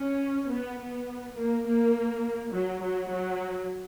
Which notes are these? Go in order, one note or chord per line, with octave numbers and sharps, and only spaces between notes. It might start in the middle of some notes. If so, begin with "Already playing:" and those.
Already playing: C#4
B3
B3
A#3
A#3
F#3
F#3
F#3